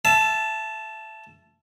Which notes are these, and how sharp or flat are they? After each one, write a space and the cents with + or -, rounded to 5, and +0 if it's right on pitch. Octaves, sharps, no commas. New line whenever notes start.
E5 +25 A5 -10